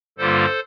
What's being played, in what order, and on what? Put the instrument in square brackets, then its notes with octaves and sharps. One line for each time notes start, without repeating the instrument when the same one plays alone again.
[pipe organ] G2 D3 G3 A#3 F4 A4 C5